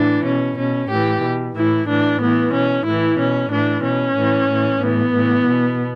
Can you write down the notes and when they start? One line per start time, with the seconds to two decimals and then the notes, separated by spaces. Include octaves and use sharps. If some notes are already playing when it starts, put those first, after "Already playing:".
Already playing: A2 E3 D4
0.25 B2 C#4
0.57 B2 C#4
0.90 A2 E3 G4
1.23 B2
1.55 A2 E3 E4
1.89 A2 E3 D4
2.21 A2 E3 B3
2.53 B2 C#4
2.86 A2 E3 E4
3.19 B2 C#4
3.51 A2 E3 D4
3.84 B2 C#4
4.16 A2 E3
4.50 A2 E3
4.82 A2 E3 B3
5.15 A2 E3
5.47 B2